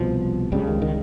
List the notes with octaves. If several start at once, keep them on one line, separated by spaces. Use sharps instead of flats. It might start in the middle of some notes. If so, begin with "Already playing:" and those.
Already playing: C2 B2 F3
C#2 C#3 G3
D#3
D#3